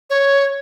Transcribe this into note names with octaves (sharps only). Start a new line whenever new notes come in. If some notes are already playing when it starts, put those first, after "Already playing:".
C#5